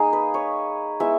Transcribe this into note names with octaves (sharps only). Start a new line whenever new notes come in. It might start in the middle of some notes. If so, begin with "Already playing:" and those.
Already playing: A#3 D#4 G#4
B4
C#5
G#3 B3 E4 E5